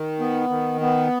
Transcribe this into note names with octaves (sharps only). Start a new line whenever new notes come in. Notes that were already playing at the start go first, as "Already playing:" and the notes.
Already playing: D#3
B3
D#3
B3